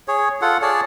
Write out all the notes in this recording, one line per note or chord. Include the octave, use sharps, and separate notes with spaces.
G#4 C#5
F4 A4 F#5
G#4 C#5 D5 A5